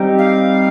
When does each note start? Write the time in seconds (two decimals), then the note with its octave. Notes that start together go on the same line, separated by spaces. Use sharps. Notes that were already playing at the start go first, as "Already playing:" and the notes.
Already playing: G3 C4 D#4 G4
0.18 F5